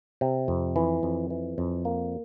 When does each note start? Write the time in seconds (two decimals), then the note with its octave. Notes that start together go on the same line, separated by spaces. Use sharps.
0.21 C3
0.48 F2
0.76 E3
1.03 F2
1.30 E3
1.58 F2
1.85 A#3